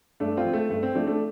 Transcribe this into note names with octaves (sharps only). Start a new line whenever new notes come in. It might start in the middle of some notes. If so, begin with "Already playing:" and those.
G2 A3 D4
C4 F4
F3
A3
G2 A3
C4
F3 A3 D4
A3 D4